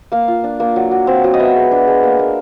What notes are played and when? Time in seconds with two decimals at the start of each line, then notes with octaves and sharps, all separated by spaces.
0.12 A#3 F5
0.28 F4
0.44 D4
0.60 A#3
0.76 F#3
0.91 F#3
1.07 C4
1.24 F#3
1.34 D#5
1.39 B3 E5
1.56 G#3
1.72 D4
1.87 G#3
2.04 A#3
2.19 A#3